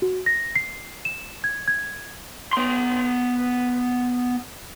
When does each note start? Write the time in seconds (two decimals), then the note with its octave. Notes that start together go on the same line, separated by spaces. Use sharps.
0.02 F#4
0.26 A#6
0.56 C7
1.05 E7
1.44 G#6
1.68 G#6
2.53 B3 C6